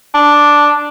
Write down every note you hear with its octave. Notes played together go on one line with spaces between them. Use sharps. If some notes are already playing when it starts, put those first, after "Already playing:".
D4